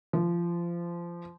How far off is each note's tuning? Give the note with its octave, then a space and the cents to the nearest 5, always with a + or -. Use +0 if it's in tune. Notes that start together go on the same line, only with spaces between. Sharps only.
F3 -25